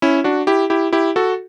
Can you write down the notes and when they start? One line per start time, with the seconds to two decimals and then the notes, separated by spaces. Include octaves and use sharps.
0.02 C#4 E4
0.24 D4 F#4
0.47 E4 G4
0.70 E4 G4
0.93 E4 G4
1.16 F#4 A4